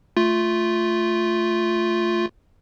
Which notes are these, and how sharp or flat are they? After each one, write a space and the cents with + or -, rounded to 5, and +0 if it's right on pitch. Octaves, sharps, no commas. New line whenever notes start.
A3 +5 F4 +0